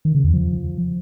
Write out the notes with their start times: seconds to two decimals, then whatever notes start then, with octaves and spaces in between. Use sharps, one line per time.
0.05 D#3
0.15 C#3
0.24 E2
0.34 F3